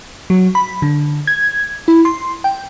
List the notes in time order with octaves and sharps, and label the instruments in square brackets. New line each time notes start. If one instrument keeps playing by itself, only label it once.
[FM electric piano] F#3
B5
D3
G#6
E4
C6
G5